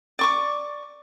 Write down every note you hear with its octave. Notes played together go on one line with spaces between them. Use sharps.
D5 C#6 D6